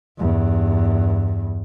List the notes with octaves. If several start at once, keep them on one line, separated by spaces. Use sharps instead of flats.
E2 G2